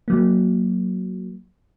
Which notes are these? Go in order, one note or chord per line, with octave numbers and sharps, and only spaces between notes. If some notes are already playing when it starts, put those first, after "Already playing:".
F#3 A#3